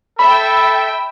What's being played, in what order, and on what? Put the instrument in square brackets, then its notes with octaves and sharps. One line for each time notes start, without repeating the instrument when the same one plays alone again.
[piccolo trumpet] A4 [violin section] E5 G5 [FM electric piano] B5